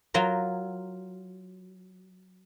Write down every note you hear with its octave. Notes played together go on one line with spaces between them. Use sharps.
F#3 F4 A#4